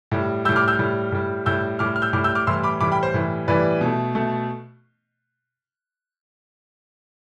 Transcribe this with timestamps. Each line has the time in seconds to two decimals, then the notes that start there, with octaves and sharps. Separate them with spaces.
0.12 A2 G3
0.45 G3 E6 G6
0.49 A2
0.56 D6 F6
0.68 E6 G6
0.79 A2 G3
1.12 A2 G3
1.46 A2 G3 E6 G6
1.79 A2 D6 F6
1.83 G3
1.96 F6
2.02 E6 G6
2.13 A2 G3 D6 F6
2.24 E6 G6
2.35 D6 F6
2.47 A2 E3 G3 C6 E6
2.63 B5 D6
2.80 A2 E3 G3 B5 D6
2.92 G5 B5
3.03 C5
3.14 A2 E3 G3
3.48 A2 E3 G3 B4 D5
3.81 B2 A3
4.15 B2 A3